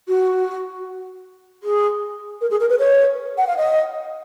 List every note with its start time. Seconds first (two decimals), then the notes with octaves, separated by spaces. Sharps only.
0.08 F#4
1.63 G#4
2.41 A#4
2.50 G#4
2.60 A#4
2.69 B4
2.79 C#5
3.37 F#5
3.47 F5
3.57 D#5